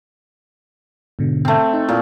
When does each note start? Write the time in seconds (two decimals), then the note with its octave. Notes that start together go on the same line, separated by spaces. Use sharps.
1.19 G#2 B2 D3
1.45 A3 C4
1.74 D#4
1.89 A#2 E4